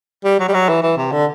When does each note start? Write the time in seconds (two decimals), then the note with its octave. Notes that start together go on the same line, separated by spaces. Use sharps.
0.25 G3
0.40 F#3
0.48 G3
0.54 F#3
0.69 E3
0.83 E3
0.97 C3
1.12 D3